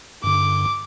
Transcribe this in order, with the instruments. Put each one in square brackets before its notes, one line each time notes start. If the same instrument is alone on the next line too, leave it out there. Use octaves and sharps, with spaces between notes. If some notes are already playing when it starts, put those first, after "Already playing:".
[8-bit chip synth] G2 D3 [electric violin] D6